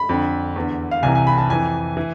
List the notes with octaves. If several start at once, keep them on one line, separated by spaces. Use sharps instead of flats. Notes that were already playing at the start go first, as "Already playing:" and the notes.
Already playing: B5
F2 D3
E2 D3
F5
C2 C3 E3 G#5
G#5
B5
A5
F2 E3 G#5
E3